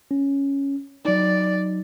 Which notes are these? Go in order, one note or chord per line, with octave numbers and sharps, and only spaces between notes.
C#4
F#3 D#4 D5